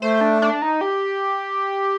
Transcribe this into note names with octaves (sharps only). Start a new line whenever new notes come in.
A3 C5
D4
D4
D#4
G4